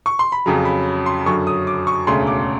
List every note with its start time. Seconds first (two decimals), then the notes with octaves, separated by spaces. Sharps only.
0.06 C#6
0.19 C6
0.32 B5
0.46 F2 C#3 F#3 A#5
0.65 B5
1.06 C6
1.26 F#2 D3 F#3 C#6
1.47 D#6
1.67 D6
1.87 C#6
2.07 E1 D2 C#3 C6
2.27 D6